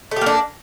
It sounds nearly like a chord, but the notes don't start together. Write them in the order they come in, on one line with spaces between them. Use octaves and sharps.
A3 G4 A#3 D4